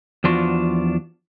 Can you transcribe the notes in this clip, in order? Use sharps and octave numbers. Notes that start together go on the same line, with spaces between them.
E2 F3 D4 F4 F#4